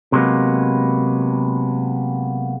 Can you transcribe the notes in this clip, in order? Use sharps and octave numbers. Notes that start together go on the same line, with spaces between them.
C3 F#3 G#3 A#3 B3